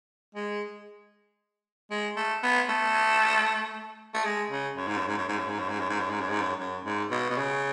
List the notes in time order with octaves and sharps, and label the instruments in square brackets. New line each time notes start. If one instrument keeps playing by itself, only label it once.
[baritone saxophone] G#3
G#3
A3
B3
A3
A3
G#3
C#3
F#2
G#2
F#2
G#2
F#2
G#2
F#2
G#2
F#2
G#2
F#2
G#2
F#2
G#2
F#2
G#2
F#2
F#2
G#2
B2
B2
C#3